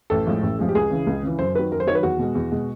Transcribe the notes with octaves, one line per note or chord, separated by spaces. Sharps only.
A1 A4
A2 F3 G#3
A1
A2 F3 G#3
G4
C#2 G#4
C#3 E3
C#2
C#3 E3
F#2 C5
D#3 F#3 B4
F#2 A#4
C5
D#3 F#3 C#5
B4
E2 F#4
B2 G#3
E2
B2 G#3